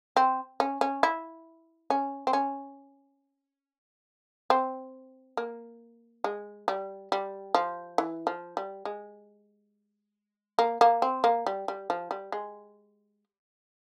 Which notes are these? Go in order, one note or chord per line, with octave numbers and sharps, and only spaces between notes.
C4
C#4
C#4
E4
C#4
C4
C#4
C4
A#3
G#3
G3
G3
F3
E3
F3
G3
G#3
A#3
A#3
C4
A#3
G3
G3
F3
G3
G#3